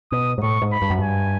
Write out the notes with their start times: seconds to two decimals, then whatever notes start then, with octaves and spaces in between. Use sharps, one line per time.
0.12 B2 D#6
0.38 G#2
0.43 A2 C#6
0.62 G#2
0.72 B5
0.82 G2
0.90 F#2
0.99 G2 G#5